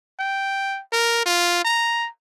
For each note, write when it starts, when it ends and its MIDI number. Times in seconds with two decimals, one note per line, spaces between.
0.19 0.81 79
0.93 1.22 70
1.26 1.64 65
1.65 2.09 82